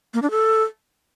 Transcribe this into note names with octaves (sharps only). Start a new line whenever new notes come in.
A#3
D4
A4